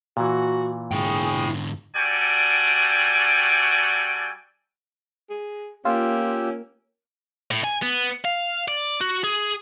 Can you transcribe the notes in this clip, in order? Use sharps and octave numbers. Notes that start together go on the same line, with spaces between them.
A#2 E3 F#4
G#2 D3 E4 G#4 G5
G3 F#4 A4 D5 G5 G#5
G#4
A#3 C#4 F4 G4 E6
A2
G#5
B3
F5
D5
F#4
G#4